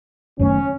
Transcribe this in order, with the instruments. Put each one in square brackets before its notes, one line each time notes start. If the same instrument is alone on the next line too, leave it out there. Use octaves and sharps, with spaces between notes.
[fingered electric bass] F#1 F#2 D#3 A3 [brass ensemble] C#4